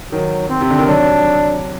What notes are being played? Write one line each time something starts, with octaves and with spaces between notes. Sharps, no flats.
D#3 F#3
C4
C3
D3
D#3
F#3 D4